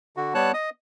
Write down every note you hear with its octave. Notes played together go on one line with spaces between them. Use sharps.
D3 F#4
G3 B3 C#5 A5 F#6
D#5 D#6